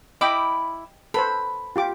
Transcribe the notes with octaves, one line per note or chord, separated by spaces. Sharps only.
E4 D#5 G5 B5 D6
A4 B4 C5 B5
F4 G4 D6